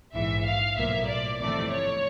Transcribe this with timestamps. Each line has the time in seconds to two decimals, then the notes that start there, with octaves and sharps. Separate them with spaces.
0.14 A#1 G#2 E3 E5
0.45 F5
0.77 B1 A2 F3 A#3 E5
1.09 D5
1.39 G1 F2 C3 E3 A3 D5
1.71 C#5